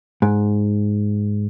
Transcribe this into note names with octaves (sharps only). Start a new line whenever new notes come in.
G#2